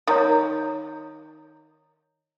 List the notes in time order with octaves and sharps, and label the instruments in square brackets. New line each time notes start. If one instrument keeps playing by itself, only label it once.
[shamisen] D#3 [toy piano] C#5 A#5 D#6